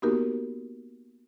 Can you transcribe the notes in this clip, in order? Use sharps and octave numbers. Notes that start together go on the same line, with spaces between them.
A#3 B3 D#4 F#4 G4 A#4